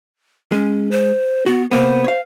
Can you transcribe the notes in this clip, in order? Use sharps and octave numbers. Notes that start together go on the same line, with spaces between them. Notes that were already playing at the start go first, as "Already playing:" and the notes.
G#3 C#4
C5
B3 F#4
C3 A#3 B3 C5
C#5 F5